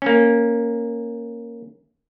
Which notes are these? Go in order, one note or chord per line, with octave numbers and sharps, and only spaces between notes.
A#3 C#4